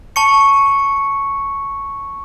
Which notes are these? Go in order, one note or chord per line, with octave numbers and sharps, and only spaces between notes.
A5 C#6 C#7